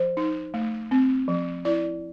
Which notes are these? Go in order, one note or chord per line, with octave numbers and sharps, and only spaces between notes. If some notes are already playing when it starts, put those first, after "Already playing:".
Already playing: F3 C5
D#4
A3
C4
F3
E4 D5